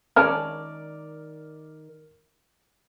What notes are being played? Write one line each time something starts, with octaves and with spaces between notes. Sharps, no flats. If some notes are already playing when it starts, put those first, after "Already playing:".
D#3 G#3 C#4 D4 A#4 D5 F6